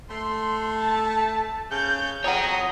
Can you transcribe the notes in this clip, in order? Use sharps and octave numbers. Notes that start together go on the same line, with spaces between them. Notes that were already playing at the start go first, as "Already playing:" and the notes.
A3 C6
A5
C#3 G6
F2 C#5 F#5 A#5 D#6